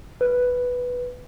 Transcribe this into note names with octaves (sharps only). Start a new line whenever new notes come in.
B4